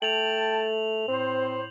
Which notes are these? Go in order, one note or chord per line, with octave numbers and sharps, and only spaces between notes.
A3 G5 A5 F7 F#7
A2 C4 C5